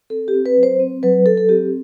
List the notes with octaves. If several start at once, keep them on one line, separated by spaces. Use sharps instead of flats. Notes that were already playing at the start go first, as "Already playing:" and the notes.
C4 A4
G4
C4
B4
F#3
C5
C4
F#3 B4
F#3 A4
A4
C4 G4